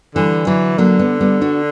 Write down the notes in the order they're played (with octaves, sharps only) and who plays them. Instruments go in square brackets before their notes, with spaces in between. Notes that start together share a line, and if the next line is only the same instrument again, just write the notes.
[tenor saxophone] D3 [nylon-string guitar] E3 G3
[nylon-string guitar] D3 F#3 [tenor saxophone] E3
[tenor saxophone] D3 [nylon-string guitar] F#3 A#3
[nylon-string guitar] G3 B3
G3 B3
D4 F#4